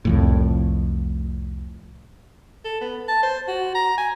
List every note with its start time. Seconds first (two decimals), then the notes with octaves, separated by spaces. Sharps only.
0.05 C2 F2 A2
2.65 A4
2.81 B3
3.08 A5
3.23 C5
3.48 F#4
3.75 A#5
3.98 G#5